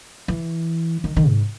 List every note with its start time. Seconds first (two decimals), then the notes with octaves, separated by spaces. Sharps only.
0.28 E3
1.04 D#3
1.16 D#3
1.29 G#2